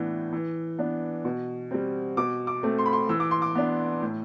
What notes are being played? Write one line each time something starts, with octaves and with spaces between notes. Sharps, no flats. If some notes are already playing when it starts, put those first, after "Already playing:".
Already playing: A2 E3 B3 D4
E3
B3 D4
B2
G3 C4
B2 D6
D6
A3 C4
C6
B5
C6
E3 E6
D6
C6
D6
B3 D4
A2